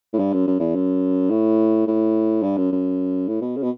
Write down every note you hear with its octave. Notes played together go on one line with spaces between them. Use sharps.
A2
G2
F#2
F#2
E2
F#2
A2
A2
G2
F#2
F#2
A2
B2
C#3
B2